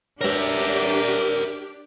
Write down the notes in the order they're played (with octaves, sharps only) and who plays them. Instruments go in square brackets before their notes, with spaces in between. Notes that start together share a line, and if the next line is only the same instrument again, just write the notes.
[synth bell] G#3 B4 C#5 [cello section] D4 G4 [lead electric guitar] A#4 E5